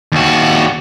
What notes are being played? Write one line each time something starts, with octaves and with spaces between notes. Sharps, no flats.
D#2 F#4